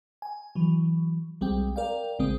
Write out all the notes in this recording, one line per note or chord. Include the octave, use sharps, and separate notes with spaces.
G#5
E3 F#3
B1 G3 G#3 C4 G5
A#4 D5 F5 G5
A#1 C#3 G#3 C4 D#6